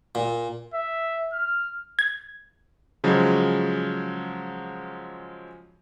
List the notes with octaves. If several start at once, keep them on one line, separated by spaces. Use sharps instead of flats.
A#2
E5
F6
G#6
C#3 F3 F#3 G#3